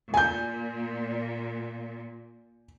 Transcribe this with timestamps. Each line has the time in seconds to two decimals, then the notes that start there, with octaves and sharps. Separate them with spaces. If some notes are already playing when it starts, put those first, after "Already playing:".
0.14 A#2 G#5 G6